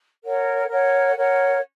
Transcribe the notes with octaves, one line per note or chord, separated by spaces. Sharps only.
A#4 C#5 F#5
A#4 C#5 F#5
A#4 C#5 F#5